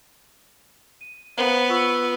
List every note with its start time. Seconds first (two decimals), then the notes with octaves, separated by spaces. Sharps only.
1.01 D#7
1.37 B3 C5 F5 A#5
1.69 F4 C#6 E6